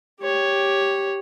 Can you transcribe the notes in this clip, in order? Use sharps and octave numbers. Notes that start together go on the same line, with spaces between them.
G4 C#5